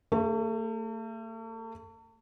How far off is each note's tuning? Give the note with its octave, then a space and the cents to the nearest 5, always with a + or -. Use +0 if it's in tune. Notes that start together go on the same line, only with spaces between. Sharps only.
A3 +40 G#4 +0